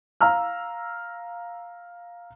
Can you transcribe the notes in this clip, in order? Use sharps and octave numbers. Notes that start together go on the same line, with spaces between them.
F5 A#5 E6 F6